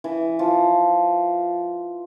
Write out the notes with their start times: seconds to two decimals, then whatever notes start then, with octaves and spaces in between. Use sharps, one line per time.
0.04 E3
0.39 F3